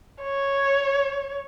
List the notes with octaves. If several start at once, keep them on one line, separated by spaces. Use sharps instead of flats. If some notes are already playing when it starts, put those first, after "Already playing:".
C#5